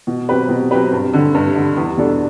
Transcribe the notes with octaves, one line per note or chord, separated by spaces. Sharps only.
B2
F#3 C4 G4 B4
B2
F#3 C4 G4 B4
G2
D3 G3
G2
D3 G3
E2
B2 G3 D4 A4